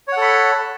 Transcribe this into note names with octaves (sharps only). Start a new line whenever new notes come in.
A4 C#5 F#5 B5